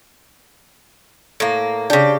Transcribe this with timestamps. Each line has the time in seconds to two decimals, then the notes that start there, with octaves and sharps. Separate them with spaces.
1.40 A2 A#3
1.90 C#3 D4 G4